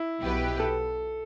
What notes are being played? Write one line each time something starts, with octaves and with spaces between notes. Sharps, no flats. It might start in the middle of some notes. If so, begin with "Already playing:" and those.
Already playing: E4
B1 B2 B3 G4 B4
A4